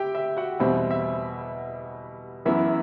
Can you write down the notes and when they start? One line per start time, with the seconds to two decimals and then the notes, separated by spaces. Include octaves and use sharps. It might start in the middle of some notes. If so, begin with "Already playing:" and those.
Already playing: G4 E5 G5
0.15 E5
0.37 F#4 F#5
0.60 E2 B2 G3 C4 E5
0.91 E5
2.45 F#2 E3 B3 E4 E5